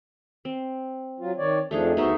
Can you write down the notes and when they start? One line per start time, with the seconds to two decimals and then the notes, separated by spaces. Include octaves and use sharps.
0.45 C4
1.20 F#3 F4
1.38 D#3 C#5 D5
1.71 F2 F3 A3 D4 D#4 G#4
1.97 D2 B3 D#4 F#4 C5 E5